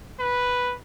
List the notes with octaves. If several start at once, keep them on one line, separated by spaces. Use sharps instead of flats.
B4